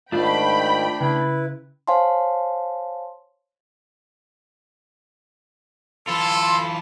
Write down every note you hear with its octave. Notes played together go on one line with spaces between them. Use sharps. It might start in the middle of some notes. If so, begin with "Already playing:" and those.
G#2 D#3 A3 D4 F4 G5 B5
C#3 E4 B4
C5 C#5 F5 G#5 A5 C6
E3 F4 A4 A5 B5 C6